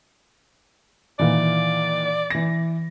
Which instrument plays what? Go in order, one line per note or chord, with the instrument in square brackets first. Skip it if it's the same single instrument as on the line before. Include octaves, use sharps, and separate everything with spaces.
[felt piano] A#2 D#3 E3 [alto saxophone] D5
[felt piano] E3 A#6